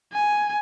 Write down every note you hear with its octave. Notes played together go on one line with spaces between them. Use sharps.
G#5